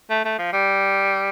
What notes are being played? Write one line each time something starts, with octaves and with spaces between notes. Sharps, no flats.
A3
A3
F3
G3